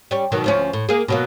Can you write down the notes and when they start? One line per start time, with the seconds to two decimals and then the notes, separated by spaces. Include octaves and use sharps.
0.11 G3 C#4
0.32 B2 D#3 F#3
0.44 D2 F3 C#4
0.73 A2
0.89 A#3 G#4
1.08 B2 F#3 A#3